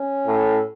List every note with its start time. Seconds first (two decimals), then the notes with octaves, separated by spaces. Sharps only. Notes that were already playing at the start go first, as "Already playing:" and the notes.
Already playing: C#4
0.27 A2